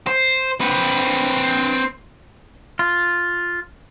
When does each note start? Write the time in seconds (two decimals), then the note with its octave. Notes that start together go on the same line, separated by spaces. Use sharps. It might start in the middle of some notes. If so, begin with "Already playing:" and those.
0.07 C5
0.60 C4 B4
2.79 F4